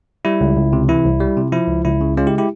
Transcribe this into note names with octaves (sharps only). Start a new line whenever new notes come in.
G3 E4
C#2
C#2
C3
E3 E4
C2
G3
C3
F3 E4
C#2
C#2 E4
C#3
G#3 C#4 F4
E4 G4
E4 G4